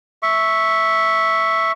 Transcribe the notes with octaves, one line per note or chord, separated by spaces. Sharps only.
E5 C#6